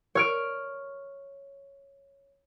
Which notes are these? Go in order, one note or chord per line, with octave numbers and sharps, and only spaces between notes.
C#5 F6 D7